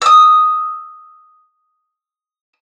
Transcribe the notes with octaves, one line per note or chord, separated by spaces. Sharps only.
D#6 E6